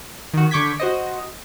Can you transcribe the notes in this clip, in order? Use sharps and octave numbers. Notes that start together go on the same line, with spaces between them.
D#3 F#4
D3 C#6 D6 G6 G#6 B6
F#4 C5 D#5